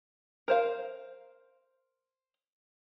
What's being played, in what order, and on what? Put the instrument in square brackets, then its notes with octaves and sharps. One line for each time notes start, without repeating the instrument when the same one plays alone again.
[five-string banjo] A#4 C5 F5